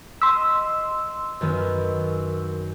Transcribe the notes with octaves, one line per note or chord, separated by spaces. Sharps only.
D#5 C6 E6 B6
F#2 D#3 B3